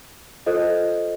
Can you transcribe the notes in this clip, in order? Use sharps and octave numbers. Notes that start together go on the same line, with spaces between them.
F4 A4 C5 D#5